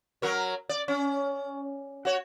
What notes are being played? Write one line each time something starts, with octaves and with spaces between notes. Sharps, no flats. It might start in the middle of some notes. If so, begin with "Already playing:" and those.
F#3 A#4 C#5
D5
C#4
F#4 C#5